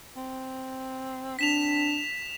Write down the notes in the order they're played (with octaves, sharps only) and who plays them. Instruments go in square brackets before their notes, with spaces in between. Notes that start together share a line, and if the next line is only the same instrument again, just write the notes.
[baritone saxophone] C4
[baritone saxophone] C4 [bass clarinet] D4 [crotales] B6 E7 F7